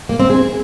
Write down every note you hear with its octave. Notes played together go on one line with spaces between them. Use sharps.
A#3
C4
G#4